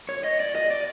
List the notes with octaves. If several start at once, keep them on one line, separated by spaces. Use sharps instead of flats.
C#5
D#5
D5
D#5
D5